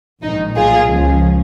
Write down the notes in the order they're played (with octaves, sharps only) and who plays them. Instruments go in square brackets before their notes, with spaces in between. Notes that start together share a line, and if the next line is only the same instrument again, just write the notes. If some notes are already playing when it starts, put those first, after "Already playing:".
[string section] A#1 G#2 D#3 D#4
B1 A#2 F3 F4 G#4
C#2 C#3 F3